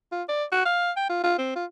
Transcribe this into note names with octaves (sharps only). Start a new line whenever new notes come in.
F4
D5
F#4
F5
G5
F4
F4
C4
F4